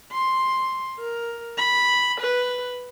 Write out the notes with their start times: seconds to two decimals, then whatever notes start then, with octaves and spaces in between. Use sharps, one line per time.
0.12 C6
1.00 A#4
1.57 B5
2.21 B4